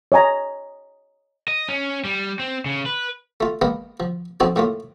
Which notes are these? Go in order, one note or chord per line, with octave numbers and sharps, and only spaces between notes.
C#5 D#5 G#5 A#5
D#5
C#4
G3
C4
C#3
B4
A3 F4
G#3 A#3 B3 F5
F3
F2 F3 C4 D#4 F#4 G#5
A2 A3 A#3 F4